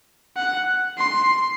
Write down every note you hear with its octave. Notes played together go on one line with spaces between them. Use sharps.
F#5
C6